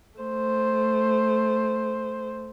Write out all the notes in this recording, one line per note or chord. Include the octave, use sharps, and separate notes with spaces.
A3 C5